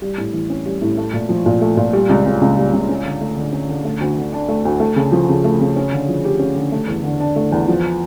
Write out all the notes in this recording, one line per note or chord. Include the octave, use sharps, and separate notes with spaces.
G3
A2
E3
C#4
G3
A2
A3
A#2
F3
A#2
A3
A#2
G3
C#2
C#3
C#2
G3
C#2
C#4
D3
A3
D3
C#4
D3
A3
D2
D3
D4
A3
D2
A3
C#3
F3
C#3
A3
C#3
C#4
D3
F3
G4
C#4
D3
A3
E2
D3
D4
A3
E2
F3